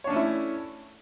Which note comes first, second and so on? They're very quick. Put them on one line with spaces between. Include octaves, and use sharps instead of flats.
C#5 D4 C#4 A3 E4